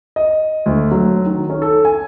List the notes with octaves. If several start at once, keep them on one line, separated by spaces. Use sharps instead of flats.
D#5
D2
F#3
D#3
C#4
A4
G#5